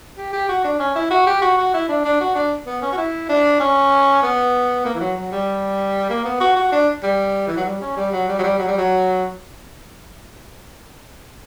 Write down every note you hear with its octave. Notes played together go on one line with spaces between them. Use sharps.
G4
G4
F#4
D4
C#4
E4
F#4
G4
F#4
F#4
E4
D4
D4
F#4
D4
B3
C#4
F#4
E4
D4
C#4
B3
A#3
E3
F#3
F#3
G3
A#3
B3
F#4
F#4
D4
G3
E3
F#3
G3
C#4
G3
F#3
G3
F#3
G3
F#3
G3
F#3